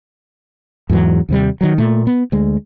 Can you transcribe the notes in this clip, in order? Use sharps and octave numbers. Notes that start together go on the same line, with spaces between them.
E2 G#2 E3 F#3
D#2 C3 G3
D#3 F#3
A#2 A3
B3
D2 G#3